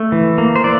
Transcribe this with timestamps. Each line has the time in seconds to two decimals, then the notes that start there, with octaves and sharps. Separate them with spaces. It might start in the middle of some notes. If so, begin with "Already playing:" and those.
Already playing: A3
0.12 E3
0.38 A#3
0.56 C5
0.64 E3 D5